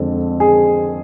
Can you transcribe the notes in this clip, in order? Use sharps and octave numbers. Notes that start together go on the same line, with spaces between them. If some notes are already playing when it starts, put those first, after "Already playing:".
Already playing: F2 D3 G#3 C4
G#4